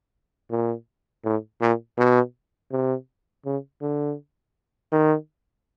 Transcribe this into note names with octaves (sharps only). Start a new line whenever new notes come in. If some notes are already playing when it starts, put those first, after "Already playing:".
A#2
A2
A#2
B2
C3
C#3
D3
D#3